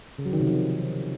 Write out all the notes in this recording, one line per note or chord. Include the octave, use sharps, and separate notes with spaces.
C#3
F#3
D#3
C3
F3